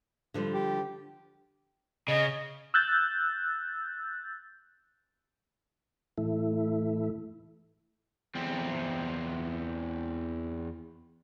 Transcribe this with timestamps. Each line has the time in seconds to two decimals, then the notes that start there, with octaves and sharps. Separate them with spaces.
0.34 D3 F3 G3
0.53 G4
2.08 C#3 D#5
2.74 E6 F#6 G6 A6
6.18 A2 E3 A3 E4
8.35 E2 C4